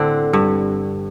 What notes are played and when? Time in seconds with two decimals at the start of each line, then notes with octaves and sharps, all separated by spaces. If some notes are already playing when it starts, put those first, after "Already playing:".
Already playing: A2 D3 C4 D4
0.33 G2